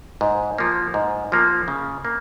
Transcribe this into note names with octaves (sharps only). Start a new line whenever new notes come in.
G#2
F3 A#3
G#2
F3 A#3
C#3
A#3